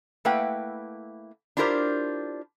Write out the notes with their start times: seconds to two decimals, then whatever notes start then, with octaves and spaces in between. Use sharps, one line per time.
0.25 A3 A#3 E4 B4 F#5 G5
1.57 D4 E4 F4 G4 A#4 C5